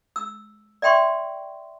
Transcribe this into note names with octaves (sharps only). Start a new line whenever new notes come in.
E6
D5 E5 G5 C6 C#6